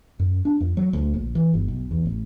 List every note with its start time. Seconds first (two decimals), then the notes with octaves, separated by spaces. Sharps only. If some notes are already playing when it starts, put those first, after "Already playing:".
0.19 F#2
0.45 D4
0.60 F2
0.77 F#3
0.93 D2
1.14 A#1
1.35 E3
1.53 G1
1.68 B1
1.91 E2
2.06 A1